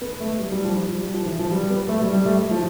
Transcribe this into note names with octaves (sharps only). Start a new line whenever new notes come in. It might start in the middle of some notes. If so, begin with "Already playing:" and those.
B3
A3
G3
G3
F3
F3
G3
F3
E3
F3
G3
B3
A3
G3
G3
A3
A3
F3